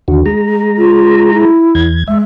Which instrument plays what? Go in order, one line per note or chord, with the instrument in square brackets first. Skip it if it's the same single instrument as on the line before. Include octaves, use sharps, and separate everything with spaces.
[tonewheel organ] D#2 D3 F#4
G#3 A#5
[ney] F4
E4
[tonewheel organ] E2 G#6
[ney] G#3 [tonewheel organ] E5